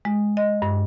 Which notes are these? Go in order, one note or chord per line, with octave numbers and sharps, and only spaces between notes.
G#3
D#5
G2